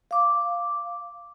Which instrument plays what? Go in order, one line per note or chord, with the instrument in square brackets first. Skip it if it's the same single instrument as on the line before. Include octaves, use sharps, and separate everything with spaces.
[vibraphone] F5 D6